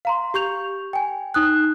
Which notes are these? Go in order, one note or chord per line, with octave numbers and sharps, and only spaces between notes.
F5 A#5 C6
G4 C#6 G6 F7
G5 G#5
D#4 D#6 F#6